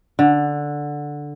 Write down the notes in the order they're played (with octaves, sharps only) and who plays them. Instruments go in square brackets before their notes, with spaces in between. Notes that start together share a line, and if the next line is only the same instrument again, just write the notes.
[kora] D3